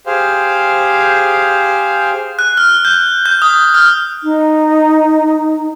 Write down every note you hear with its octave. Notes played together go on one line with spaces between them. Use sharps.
G4 G#4 C5 F5
F#6
F6
G6
G6
D#6
F6
D#4